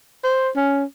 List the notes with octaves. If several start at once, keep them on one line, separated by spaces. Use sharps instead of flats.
C5
C#4